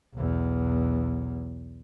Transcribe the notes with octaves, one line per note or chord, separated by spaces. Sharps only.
B1 E2